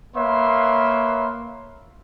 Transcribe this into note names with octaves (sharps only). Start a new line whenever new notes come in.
A#3 B4 C#5 E5 C6